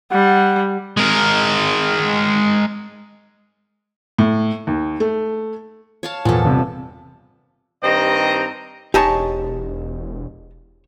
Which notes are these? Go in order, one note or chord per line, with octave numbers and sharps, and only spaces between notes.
G3 F#5
G#3 A#4
A2
D#2
A3
C#5 F5 A5
E2 A#2 F3 A4
G1 C3
G2 D#3 C4 G4 D#5 A#5
E1 G#3 D#4 G4 C#5 A5